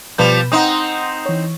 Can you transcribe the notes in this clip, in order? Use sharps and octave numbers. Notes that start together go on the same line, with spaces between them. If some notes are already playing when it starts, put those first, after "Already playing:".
B2 F3 G3 B4 G6
C4 D#4 F#5 C6 D#6
E3 C#5